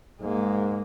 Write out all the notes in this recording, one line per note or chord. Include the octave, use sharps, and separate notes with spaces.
G#2 G#3 A#3